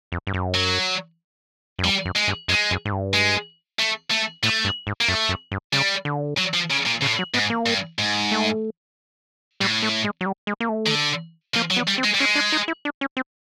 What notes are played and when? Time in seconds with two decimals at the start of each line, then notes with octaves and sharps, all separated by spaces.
0.12 F2
0.27 G2
0.34 F#2
0.55 F#3
1.79 F#2
1.84 F2 G3
2.05 F#2
2.16 G#3
2.28 G2
2.48 F#2 G#3
2.71 F#2
2.85 G#2
2.92 G2
3.14 G#3
3.79 A3
4.11 A3
4.43 A2 A3
4.64 G2
4.87 G#2
5.01 A#3
5.08 F#2 A3
5.29 F#2
5.52 G2
5.73 C#3 G3
6.05 D3
6.38 F#3
6.54 F3
6.70 C#3
6.86 A#2
7.02 A2 C#3
7.19 F#3
7.34 G#2 B3
7.50 A#3
7.66 G2
7.99 G#2
8.31 A3
9.60 A2 G3
9.83 A3
10.04 G#3
10.21 F#3
10.26 G3
10.47 G#3
10.60 A#3
10.69 A3
10.86 D#3
10.90 D3
11.55 F3 A#3
11.71 F#3
11.77 B3
11.87 G3
11.98 C4
12.04 G#3
12.14 G3
12.19 G#3 C#4
12.35 D4
12.52 D#4
12.68 E4
12.85 D4
13.01 C#4
13.17 C4